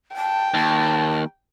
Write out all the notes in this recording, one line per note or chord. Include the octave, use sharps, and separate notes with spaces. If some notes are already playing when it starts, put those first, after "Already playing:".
G5 A5
D#2 A5